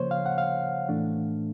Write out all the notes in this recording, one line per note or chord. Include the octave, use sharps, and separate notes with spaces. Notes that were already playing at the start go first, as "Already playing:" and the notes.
Already playing: C#3 F3 A#3 C5 C#5
F5
F#5
F5
A2 E3 A3 D4